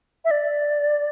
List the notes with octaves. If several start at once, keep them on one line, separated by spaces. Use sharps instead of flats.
E5
D5